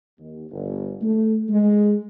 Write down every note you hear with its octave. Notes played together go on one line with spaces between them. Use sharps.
D#2
G1
A3
G#3